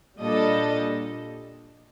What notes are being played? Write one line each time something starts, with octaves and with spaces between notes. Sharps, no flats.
A#2 G3 D4 A4 D#5